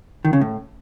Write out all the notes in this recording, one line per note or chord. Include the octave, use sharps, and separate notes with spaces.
D#3
C#3
A2